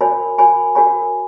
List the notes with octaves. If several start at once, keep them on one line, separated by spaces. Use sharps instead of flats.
F#4 A#4 C#5 G#5 B5
F#4 A#4 C#5 G#5 B5
F#4 A#4 C#5 G#5 B5